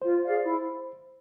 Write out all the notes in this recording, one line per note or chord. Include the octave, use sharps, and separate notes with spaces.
F4 C5
G#4 D5 F5
E4